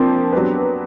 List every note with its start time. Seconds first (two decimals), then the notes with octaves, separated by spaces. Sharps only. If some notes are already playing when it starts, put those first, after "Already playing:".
Already playing: F3 A#3 C4 D4
0.33 F#3 B3 D4 G4 B4